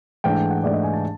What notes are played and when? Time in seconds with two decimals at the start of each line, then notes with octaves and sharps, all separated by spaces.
0.24 G#2 E3 A3 D4 G5
0.50 F#5
0.63 G#2 E3 A3 D4 D5
0.73 D#5
0.83 G#5
0.93 A5